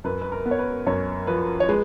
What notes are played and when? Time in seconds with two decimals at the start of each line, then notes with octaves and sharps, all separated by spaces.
0.04 F#2 B4
0.22 B4
0.32 A#4
0.46 B3
0.51 C#5
0.59 B4
0.86 F#2 C#5
1.27 F3 B4
1.60 C#5
1.69 G#3 B4